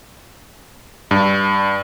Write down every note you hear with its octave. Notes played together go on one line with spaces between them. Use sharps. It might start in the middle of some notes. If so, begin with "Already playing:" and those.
G2